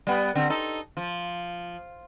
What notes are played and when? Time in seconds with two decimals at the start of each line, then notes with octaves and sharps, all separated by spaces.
0.07 G3 B3
0.35 D3 C4
0.50 D#4 A4
0.97 F3